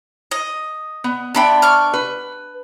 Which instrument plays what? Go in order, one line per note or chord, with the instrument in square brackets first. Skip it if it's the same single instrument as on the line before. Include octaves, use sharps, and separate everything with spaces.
[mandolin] D#5
[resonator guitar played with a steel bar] B3
[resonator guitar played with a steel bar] B3 D4 E5 [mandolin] G5 B5 C6
[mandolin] C#6 D6 F6
[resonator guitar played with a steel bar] B4